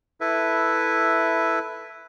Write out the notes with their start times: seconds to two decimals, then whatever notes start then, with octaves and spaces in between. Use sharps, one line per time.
0.21 E4 A4 B4 E5